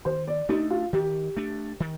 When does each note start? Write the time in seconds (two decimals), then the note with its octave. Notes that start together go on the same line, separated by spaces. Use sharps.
0.05 D#3 C5
0.28 D5
0.49 A3 D4 D#4
0.70 F4
0.93 D#3 G4
1.37 A3 D4
1.80 D#3